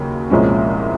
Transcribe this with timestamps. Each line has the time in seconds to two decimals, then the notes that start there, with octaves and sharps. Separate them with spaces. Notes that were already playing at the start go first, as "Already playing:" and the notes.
Already playing: D#2 C#3 F#3
0.30 C2 A#2 F3 G#3 C#4